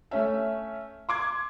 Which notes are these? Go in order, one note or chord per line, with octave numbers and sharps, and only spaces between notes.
A3 C#4 E5
C6 D6 G#6